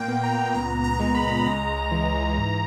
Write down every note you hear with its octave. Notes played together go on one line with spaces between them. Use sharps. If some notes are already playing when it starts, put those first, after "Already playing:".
Already playing: A#2 A#3 G5
B3
A#5
C#2 A#5
A#5
G#3
B5
C#2 A#5
E3
G#2